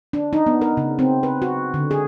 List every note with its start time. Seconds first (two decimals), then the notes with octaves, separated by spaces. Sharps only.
0.13 D4
0.33 D#4
0.46 B3
0.61 A#4
0.77 C#3
0.99 C4
1.23 B4
1.42 F#4
1.74 D3
1.91 G#4